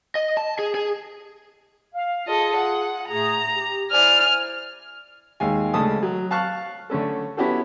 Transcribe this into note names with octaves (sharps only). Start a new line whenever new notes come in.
D#5
A5
G#4
G#4
F5
F4 G#4 A4 D#5
F#5
A2 A3 G#4 A#5
G4
E4 C5 D5 G#5 F6
D#2 G#3 F5 G#5
D2 C#3 G#3 A4 A5 D#6
F#3
F5 A5 C#6 F6 F#6
D3 A3 C#4 A4
B3 C#4 E4 F#4 G4 A4